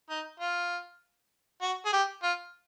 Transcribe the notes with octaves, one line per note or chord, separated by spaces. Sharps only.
D#4
F4
F#4
G#4
G4
F4